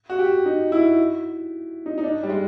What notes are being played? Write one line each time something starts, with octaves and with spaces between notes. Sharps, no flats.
F#4
G4
D#4
E4
D#4
D#4
D4
G3
G#3